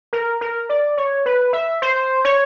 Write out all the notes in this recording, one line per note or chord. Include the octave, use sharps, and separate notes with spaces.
A#4
A#4
D5
C#5
B4
E5
C5
C#5